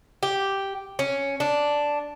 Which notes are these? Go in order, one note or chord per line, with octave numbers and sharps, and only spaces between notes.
G4
C#4
D4